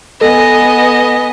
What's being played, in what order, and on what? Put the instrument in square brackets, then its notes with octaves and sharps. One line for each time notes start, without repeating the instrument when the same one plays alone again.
[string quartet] B3 D#5 G#5 [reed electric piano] A4